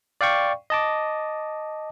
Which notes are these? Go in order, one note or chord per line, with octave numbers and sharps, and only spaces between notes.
D5 F5 G5 C#6
D#5 A5 D6